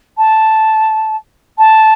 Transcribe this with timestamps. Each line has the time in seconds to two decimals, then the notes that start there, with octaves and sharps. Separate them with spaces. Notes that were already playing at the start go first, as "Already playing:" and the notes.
0.17 A5
1.58 A5